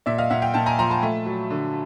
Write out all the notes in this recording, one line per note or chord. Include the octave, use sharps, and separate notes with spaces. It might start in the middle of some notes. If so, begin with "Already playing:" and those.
A#2 D5 E5
D#5 F5
A#2 E5 F#5
F5 G5
A#2 G5 A5
G#5 A#5
F3 A#5 C6
A5 B5
A3
F#3
D3